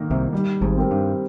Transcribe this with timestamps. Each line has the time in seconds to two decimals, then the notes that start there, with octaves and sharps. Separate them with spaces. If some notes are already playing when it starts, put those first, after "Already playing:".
Already playing: G#2 D#3 A#3 D#4 A#4
0.10 C2 C3
0.33 G3
0.61 G#1 G#2
0.77 C4 G4 A#4
0.91 G2